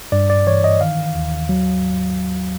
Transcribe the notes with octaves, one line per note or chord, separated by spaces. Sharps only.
G2 D5
D5
E3 C#5
D#5
D#3 F5
D#2
F#3